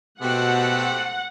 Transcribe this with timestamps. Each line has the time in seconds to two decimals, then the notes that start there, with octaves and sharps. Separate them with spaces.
0.22 B2 A3 C4 G4 F#5